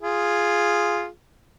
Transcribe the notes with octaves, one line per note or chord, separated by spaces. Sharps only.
F4 G#4